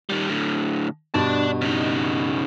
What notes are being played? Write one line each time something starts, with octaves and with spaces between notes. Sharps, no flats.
D#3 G3
A2 D3
G2 B2 D5 A5 A6
C#3 D#4